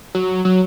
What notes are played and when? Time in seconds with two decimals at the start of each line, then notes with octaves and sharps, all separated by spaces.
0.15 F#3
0.45 F#3